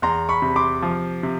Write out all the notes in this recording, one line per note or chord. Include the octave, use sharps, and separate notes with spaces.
E2 A#5 C6
B5 C#6
C3
C6 D6
F3
C3